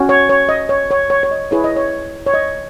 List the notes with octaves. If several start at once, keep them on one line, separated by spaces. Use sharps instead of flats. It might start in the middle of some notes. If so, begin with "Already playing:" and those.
Already playing: C#4 F#4
C#5
C#5
D#5
C#5
C#5
C#5
C#5
D#5
E4 G#4 B4 C#5
D#5
C#5
C#5
D#5